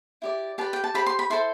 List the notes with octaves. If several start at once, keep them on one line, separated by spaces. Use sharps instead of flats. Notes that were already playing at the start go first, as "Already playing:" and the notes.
E4 G4 D5
G4 B4 D5 A5
G5
A5
G4 C5 B5
C6
B5
E4 A4 C5 C6